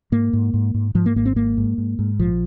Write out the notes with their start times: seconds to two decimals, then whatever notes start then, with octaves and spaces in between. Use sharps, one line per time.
0.12 G#2 A#3
0.33 G#2
0.54 G#2
0.74 G#2
0.95 G#2 F3
1.06 A#3
1.16 G#1 A#3
1.26 C4
1.36 G#2 A#3
1.57 G#2
1.78 G#2
1.99 G#2
2.19 A#1 F3